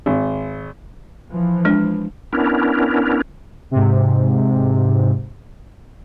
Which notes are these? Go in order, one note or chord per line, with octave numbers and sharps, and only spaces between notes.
G#1
E3 F3
G#3 D4
B3 C#4 D4 E4 A#4
G#2 C3